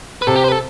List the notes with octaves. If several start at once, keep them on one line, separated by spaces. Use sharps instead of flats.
B4
C3 A4
G4
C5
B4
A4